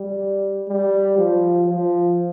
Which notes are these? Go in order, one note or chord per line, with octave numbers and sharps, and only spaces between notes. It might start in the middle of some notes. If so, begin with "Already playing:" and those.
Already playing: G3
G3
F3
F3